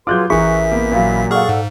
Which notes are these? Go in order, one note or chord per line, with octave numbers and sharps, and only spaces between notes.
F#3 F4 G#4 B4 C6 D6 F#6 G6
A1 E3 G#4 A#4 E5 C#6 B6
A#3 B3
A#2 F#3 F5 B5
G#4 A4 D5 F5 F#5 C#6 F6
G#2